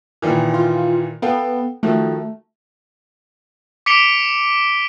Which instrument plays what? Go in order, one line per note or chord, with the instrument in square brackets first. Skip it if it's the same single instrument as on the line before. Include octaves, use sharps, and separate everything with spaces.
[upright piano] A#2 D#3 E3
[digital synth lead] F4
[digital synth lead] B3 [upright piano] A4 F5 G5
[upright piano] D#3 F3 F#4 [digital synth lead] A3
[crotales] D6 B6 C#7 D7 F7 G7